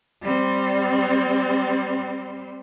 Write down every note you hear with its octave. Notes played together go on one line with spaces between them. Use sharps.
G3 C4